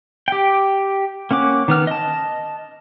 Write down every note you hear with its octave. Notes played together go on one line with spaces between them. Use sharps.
G4 G5
A#3 C#4 F#5 D6
D#3 B3 F6
D#5 A5